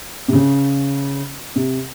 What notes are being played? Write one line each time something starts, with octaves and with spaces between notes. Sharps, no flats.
C3
C#3
C3